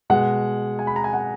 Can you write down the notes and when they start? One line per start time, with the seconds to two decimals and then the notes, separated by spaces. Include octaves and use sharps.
0.10 B2 G#3 F#5
0.79 G#5
0.87 B5
0.96 A#5
1.04 G#5
1.13 F#5